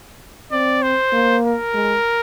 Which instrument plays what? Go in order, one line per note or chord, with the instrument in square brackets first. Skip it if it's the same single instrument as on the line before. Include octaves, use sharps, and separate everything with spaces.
[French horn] C4 [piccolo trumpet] D5
[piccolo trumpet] C5
[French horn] A#3
[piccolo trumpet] A#4
[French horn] G#3